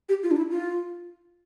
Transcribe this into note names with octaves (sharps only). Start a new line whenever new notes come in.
G4
F4
D4
E4
F4